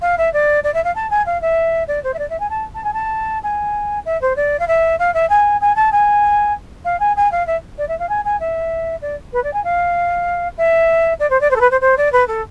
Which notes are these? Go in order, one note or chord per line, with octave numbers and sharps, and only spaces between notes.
F5
E5
D5
D5
E5
F5
A5
G#5
F5
E5
D5
C5
E5
D5
E5
G#5
A5
A5
G#5
A5
G#5
E5
C5
D5
F5
E5
F5
E5
G#5
G#5
A5
G#5
F5
G#5
G#5
F5
E5
D5
E5
F5
G#5
G#5
E5
D5
B4
D5
G#5
F5
E5
D5
C5
D5
C5
A4
B4
C5
C5
D5
B4
A4